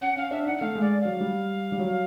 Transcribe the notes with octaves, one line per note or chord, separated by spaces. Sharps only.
C#4 F#5
C#4 F5
D4 E5
D#4 F#5
F#5
A3 F5
G#3
D5
F#3 F5
G3
G3
F#3